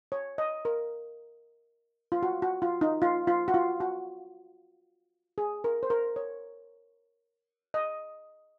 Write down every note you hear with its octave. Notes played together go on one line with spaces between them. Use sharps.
C#5
D#5
A#4
F4
F#4
F#4
F4
D#4
F4
F4
F#4
F4
F#4
G#4
A#4
C5
A#4
C#5
D#5